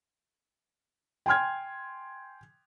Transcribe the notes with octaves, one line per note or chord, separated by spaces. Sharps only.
G5 G#5 C6 F6 G#6